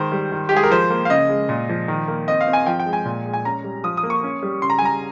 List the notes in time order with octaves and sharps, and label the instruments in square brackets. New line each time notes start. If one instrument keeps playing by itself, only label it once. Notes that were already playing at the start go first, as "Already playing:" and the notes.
Already playing: [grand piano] D#3 G#3 C5
G3
D#3
G4
G#3 G#4
A#4
F3 C5
A#3
F5
C#3 D#5
G#3
A#2
F3
D#3
A#3
C4 D#5
F5
C4
G#5
F3 G5
G5
G#3
G#5
A#2
G#3
G#5
C#4 A#5
G3
F3 D#6
D#6
A#3
C#6
C#4
G3
C#3 C6
A#5
G#5
G3 A#5